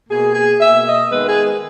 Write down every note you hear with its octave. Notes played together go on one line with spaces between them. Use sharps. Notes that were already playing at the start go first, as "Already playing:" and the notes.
B2 A#3 G#4
G#4
B2 A#3 E5
D#5
D#3 G#3 B3 B4
G#4